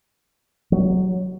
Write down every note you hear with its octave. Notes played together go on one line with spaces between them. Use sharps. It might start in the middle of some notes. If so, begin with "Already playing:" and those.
F#3